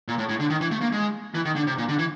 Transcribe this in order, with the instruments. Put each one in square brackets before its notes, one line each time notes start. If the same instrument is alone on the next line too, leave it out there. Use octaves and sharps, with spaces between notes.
[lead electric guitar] A#2
A2
A2
D3
D#3
E3
A3
A#3
G#3
E3
D#3
D3
C3
A#2
D3
E3